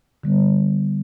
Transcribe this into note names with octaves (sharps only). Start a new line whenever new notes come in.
D3 G3 B3